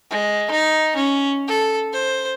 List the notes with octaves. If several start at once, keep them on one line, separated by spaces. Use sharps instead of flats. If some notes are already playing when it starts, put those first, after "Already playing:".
G#3
D#4
C#4
A4
C5